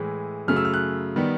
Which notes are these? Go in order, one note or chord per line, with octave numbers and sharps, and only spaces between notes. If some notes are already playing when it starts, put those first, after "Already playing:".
Already playing: A2 E3 G#3
F#2 C#3 F#3 A3 F6
E6
F6
F#6
D#3 G3 B3